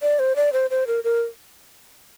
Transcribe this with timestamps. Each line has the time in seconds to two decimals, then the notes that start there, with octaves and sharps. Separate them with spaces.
0.02 D5
0.19 C5
0.36 D5
0.53 C5
0.70 C5
0.87 A#4
1.04 A#4